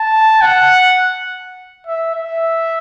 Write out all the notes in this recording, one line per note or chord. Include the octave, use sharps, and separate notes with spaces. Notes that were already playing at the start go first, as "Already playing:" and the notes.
Already playing: A5
F#5
E5
E5